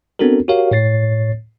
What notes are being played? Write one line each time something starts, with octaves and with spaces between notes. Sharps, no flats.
B3 C4 D4 F#4 A4 A#4
F#4 G4 A#4 C#5 F5
A2 C#5 A6 C7